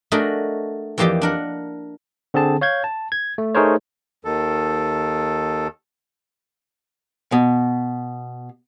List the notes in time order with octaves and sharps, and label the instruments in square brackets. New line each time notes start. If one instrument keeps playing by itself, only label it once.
[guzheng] A3 D4 F#4 G#4 A#4 D#5
F2 E3 A#3 G4 D5 D#5
D4 A#4 F#5
[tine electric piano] D3 C4 G#4 A5
C#5 F5 G6 G#6
A5
G#6
A3
A3 D#4 G#4 A#4 C5 C#5
[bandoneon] D#2 D#3 A4
[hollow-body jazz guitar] B2